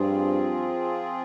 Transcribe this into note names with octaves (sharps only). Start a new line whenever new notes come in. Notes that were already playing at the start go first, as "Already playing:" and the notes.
Already playing: G2 F3 C4 F4 G#4